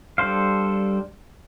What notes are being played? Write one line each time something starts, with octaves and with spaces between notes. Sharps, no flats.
G3 D4 A4 C5 F5